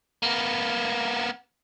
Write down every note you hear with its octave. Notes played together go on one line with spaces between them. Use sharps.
A#3 B3